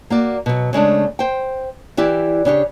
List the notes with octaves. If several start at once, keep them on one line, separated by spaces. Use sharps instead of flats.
A#3 F#4 D5
B2 F#3
C#3 G#3 A3 D4
C5 G5
E3 E4 G4 D5
C#3 D4 G4 C#5